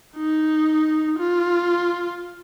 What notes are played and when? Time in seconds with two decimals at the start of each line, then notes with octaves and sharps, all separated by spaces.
0.17 D#4
1.19 F4